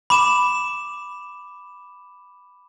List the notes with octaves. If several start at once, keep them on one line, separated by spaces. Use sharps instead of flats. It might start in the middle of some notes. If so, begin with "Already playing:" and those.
B5 D6 E7